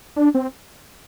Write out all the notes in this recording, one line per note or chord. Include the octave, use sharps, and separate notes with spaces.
D4
C4